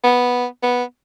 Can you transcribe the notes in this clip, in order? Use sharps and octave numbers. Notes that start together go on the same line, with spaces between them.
B3
B3